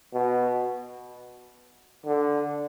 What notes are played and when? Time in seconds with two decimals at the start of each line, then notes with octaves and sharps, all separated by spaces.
0.14 B2
2.06 D3